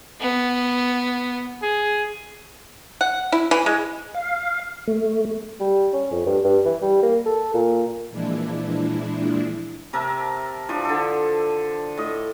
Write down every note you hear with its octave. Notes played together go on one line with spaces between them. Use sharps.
B3
G#4
F#5
E4
E3
G#3
F5
A3
G3
C#4
F2
G2
G2
E3
G3
A#3
A4
A#2
A#2 E3 F3 G#3 D4 E4
C3 A#4 E5 A5
E3 F3 D4
D3 A4
A2 D#5